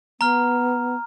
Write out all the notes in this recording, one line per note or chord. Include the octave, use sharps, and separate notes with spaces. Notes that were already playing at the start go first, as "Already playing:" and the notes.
B3 A#5 F6